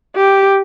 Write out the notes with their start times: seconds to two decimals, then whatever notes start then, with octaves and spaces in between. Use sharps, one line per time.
0.16 G4